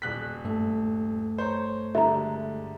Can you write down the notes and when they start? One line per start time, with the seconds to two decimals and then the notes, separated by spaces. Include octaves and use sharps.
0.02 D#1 F#6 B6
0.44 G2 A3 A4
1.38 C5 C#5 A#5
1.95 D3 G3 G#3 E5 A#5